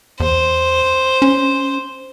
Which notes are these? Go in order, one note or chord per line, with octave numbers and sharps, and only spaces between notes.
E2 C5
C#4